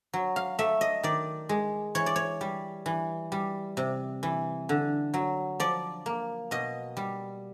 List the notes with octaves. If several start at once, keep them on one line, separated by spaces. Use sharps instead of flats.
F#3
F5
A3 E5
D#5
D#3 D5
G#3
E3 C#5
D5
C#5
G3
E3
G3
C3
E3
D3
F#3
F3 D5
A#3
B2 D#5
G3